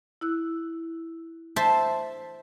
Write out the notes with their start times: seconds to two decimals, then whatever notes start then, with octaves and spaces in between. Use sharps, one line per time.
0.21 E4 E6 F#6
1.56 C5 E5 A5